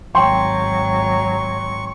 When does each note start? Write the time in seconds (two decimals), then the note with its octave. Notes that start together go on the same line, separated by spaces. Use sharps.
0.15 G#1 F#3 G5 C6 C#6